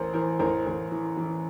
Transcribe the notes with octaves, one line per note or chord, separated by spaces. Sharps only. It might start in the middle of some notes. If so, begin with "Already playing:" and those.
Already playing: A1 A#4 C5
E3 A#4 C5
A1 A#4 C5
A1
E3
E3